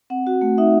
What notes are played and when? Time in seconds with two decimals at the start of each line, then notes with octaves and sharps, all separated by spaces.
0.10 C4 F#5
0.27 F#4
0.41 A3
0.58 D#4 E5